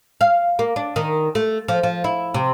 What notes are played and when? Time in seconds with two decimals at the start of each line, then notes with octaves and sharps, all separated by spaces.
0.21 F5
0.59 A#3
0.76 D4
0.96 D#3
1.35 A3
1.68 F3
1.83 F3
2.04 E4
2.34 C3